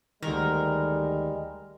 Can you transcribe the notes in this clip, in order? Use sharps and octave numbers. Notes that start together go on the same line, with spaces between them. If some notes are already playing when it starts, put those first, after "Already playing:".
D2 D#3 G3 G#3 A#4